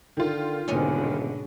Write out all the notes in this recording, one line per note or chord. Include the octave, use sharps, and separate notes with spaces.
D3 D#3 F4
D#1 G#2 B2 D3 C#4 D#5